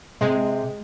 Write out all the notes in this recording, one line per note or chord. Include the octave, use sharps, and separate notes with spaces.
C3 G#3